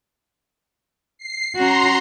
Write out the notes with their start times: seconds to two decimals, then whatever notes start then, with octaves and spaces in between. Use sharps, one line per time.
1.18 C7
1.56 C#4 F#4 A#5 C6 C7